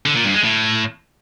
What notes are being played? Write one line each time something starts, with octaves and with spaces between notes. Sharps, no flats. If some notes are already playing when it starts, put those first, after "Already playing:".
D3
A#2
G2
G#3
A2